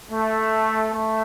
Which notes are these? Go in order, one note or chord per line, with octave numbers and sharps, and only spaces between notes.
A3
A3